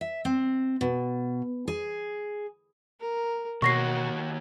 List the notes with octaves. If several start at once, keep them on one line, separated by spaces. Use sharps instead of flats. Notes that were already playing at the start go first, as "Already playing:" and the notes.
E5
C4
B2
G#4
A#4
B2 D#3 A#3 F#4 C#5 C#6 A#6 C7